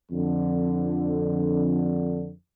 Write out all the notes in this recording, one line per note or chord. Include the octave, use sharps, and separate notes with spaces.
F2 D3